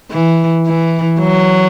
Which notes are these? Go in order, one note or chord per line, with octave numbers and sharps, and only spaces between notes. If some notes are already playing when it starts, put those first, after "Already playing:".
E3
E3
F#3